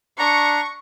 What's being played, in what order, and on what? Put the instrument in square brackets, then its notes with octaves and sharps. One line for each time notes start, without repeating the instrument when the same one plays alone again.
[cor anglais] D4 [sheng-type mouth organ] A#5 [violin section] C#6